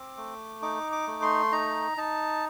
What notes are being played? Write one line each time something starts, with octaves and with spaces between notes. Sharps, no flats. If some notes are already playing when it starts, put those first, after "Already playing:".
Already playing: C4 D6
A3
D#4 D6
D6
A3
C6
D#4 A#5
D#4 A5